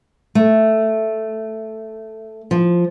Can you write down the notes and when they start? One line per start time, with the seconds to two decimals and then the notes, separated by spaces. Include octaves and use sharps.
0.35 A3
2.51 F3